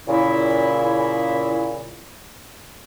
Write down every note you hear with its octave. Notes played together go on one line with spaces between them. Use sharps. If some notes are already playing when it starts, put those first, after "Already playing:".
A#2 C#3 E4